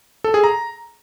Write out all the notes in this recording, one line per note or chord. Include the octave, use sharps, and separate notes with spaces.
A4
G#4
A#5